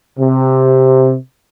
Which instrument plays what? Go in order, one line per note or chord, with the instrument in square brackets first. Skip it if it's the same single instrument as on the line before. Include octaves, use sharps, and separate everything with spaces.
[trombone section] C3